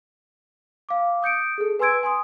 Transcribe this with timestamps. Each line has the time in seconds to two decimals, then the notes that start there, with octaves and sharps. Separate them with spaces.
0.89 F5 D6
1.22 D#6 G6 C#7 D7
1.58 G#4 A4
1.79 B4 G#5 C6 E6 G#6 D7
2.03 G#5 C6 D#6